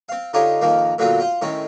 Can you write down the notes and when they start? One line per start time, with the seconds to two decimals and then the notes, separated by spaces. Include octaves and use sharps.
0.09 C4 F5
0.33 D3 D#4 F4 G4 C#5
0.61 F2 D#3 F3 A#3
0.98 A#2 D3 F#3 B3 C4 F4
1.20 F4 C5
1.42 A2 D#3 C4 C#4